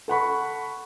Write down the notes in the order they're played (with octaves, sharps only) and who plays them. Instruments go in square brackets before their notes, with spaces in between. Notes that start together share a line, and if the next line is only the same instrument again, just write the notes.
[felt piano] A4 F#5 B5 C#6